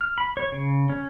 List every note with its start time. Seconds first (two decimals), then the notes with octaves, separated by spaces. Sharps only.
0.01 F6
0.18 B5
0.37 C#5
0.52 C#3
0.90 C#4